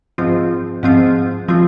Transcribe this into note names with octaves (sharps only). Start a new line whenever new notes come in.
G#2 F3 C4 F4
G#2 F3 C4 F4
F3 C4 F4